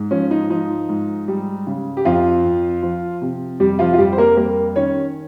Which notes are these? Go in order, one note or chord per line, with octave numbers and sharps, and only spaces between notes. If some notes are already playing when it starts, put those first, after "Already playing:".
Already playing: G#2
F3 C#4
D#4
F3 D#4
G#2
G3
C#3
G4
F2 F3 F4
F2
F3
C3
F2 G3 G4
F3 F4
F4
F2 G3 G4
C5
A#3 A#4
G3 A#3 A#4
D#3 C#4 C#5